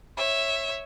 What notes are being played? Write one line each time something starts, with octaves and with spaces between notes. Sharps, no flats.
C#5 E5